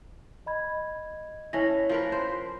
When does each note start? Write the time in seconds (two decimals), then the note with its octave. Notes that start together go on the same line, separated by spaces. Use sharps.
0.46 D#5 B5 G#6
1.53 E3 C#4 C#5 A5 A#6
1.89 F3 A#4 B4
2.12 C5